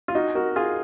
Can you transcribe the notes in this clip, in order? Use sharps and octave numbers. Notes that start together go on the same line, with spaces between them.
F4
D#4 F#4
F#4 A#4
F4 G#4